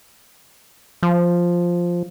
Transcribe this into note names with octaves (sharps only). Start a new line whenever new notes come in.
F3